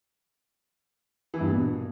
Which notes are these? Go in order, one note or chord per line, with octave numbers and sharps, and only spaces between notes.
E3
G2
A#2
B2